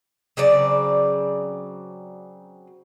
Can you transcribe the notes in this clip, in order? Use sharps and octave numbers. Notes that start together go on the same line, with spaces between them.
C#3 F#3 C4 D5